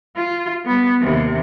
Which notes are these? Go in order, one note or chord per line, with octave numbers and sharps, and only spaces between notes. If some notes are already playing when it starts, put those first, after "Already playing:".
F4
G3 B3
D#2 C3